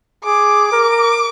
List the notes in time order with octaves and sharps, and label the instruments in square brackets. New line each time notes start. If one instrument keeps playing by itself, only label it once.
[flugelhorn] G#4 [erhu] D6
[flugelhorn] A#4